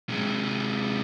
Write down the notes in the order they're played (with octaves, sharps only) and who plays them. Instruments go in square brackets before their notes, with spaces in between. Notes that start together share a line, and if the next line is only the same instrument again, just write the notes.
[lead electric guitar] C3 G#3